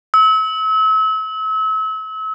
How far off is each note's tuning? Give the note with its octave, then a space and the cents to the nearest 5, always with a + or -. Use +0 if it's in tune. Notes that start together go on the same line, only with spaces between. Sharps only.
E6 -35